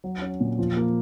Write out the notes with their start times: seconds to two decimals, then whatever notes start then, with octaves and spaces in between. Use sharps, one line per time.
0.04 F#3
0.22 C#4
0.41 A#2
0.59 F3
0.77 A#3